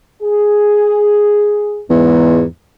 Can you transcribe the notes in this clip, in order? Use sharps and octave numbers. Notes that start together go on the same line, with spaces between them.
G#4
E2 G#2